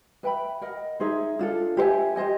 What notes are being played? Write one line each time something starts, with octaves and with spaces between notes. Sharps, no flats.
B4 E5 G5 B5
A#4 D#5 F#5
D#4 G#4 C5 E5
D4 F4 A4
G4 C5 E5 G#5
G4 C5 D#5 G#5